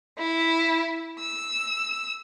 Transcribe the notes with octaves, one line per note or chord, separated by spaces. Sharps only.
E4
E6